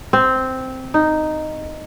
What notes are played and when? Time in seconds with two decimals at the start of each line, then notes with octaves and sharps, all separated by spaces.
0.13 C4
0.94 D#4